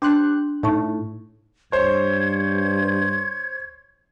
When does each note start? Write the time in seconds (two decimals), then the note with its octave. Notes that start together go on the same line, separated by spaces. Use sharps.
0.02 D4 G4 C5 F#6
0.63 A2 D#4 A5 C#6
1.72 G2 C5 C#5 G#6